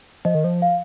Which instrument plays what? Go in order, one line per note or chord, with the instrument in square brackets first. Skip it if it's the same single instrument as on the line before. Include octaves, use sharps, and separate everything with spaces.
[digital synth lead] F3 [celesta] D#5
[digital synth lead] D#3
F3
[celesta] F5